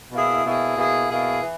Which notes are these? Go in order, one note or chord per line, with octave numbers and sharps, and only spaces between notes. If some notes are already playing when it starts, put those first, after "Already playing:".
B2 A#3 E4 G#4
B2 A#3 E4 G#4
B2 A#3 E4 G#4
B2 A#3 E4 G#4
E3